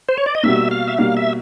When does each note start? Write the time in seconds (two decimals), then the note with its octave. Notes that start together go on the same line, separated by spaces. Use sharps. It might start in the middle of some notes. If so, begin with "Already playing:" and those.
0.09 C5
0.18 C#5
0.26 D5
0.35 D#5
0.43 B2 G3 A#3 E5
0.71 F5
0.88 E5
0.98 B2 G3 A#3 F5
1.17 E5